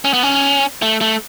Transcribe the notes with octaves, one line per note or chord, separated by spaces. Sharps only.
C#4
B3
C#4
A3
A3